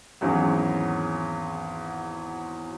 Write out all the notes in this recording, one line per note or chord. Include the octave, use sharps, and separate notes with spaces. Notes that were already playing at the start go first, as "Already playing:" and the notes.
G#1 E2 F#3 C#4 G#4